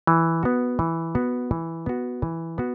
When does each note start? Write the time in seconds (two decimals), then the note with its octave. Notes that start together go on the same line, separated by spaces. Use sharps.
0.07 E3
0.43 B3 F#4
0.79 E3
1.15 B3 F#4
1.51 E3
1.86 B3 F#4
2.22 E3
2.58 B3 F#4